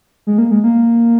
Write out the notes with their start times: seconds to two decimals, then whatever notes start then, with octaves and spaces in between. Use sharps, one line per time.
0.27 G#3
0.38 A#3
0.51 G#3
0.64 A#3